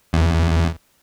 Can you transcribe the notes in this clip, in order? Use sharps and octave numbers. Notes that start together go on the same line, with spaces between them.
E2